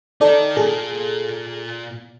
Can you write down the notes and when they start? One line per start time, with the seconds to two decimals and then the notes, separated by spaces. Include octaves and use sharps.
0.21 D#4 A4 A#4 D5
0.57 A#2 G#4 A4